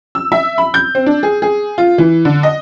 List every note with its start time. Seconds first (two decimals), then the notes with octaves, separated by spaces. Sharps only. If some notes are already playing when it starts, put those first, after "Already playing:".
0.15 E6
0.32 E5
0.58 B5
0.74 G6
0.95 C4
1.06 D4
1.23 G#4
1.42 G#4
1.78 F4
1.98 E3
2.25 D3
2.43 D#5